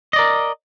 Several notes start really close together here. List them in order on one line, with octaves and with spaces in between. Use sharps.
D#5 D5 A#4